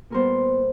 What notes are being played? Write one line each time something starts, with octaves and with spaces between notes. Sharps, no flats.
A#2 G3 B3 A#4 C5